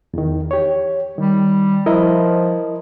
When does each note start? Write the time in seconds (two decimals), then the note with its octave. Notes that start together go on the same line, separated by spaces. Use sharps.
0.14 E2 D#3
0.51 G4 C#5
1.18 D#3 G3
1.86 F3 E4 A#4 D#5